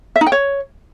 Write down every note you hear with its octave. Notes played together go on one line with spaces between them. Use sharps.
E5
D#4
G5
C#5